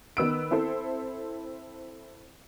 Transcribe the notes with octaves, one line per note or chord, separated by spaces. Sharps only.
D#3 B3 E6 D7
C4 E4 A4 C5